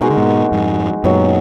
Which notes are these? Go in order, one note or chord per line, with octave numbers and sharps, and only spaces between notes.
B2 G#3 D#4 F#4 A#4
D3
G#2 B2
F2 G#2
F#2 A#2 D#3 F#3 B3